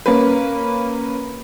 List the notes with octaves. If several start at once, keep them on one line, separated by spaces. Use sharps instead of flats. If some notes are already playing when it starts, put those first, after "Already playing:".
A#3 C#4 B4